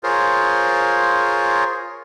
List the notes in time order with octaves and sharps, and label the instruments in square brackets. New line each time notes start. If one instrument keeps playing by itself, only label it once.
[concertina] F4 G#4 A#4 C5 C#5